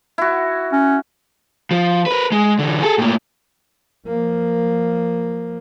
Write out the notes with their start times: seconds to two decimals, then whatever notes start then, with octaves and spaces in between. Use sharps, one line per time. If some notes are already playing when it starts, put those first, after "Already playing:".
0.18 E4 F#4
0.72 C#4
1.71 F3
2.06 A#4 B4
2.32 G#3
2.59 D3 E3
2.81 G#4 A4
2.98 A2 A#3
4.07 F3 A#3